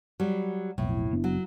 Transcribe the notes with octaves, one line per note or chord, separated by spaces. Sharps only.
F#3 G3
B1 F2 A2
F#1 B3 D4
F#3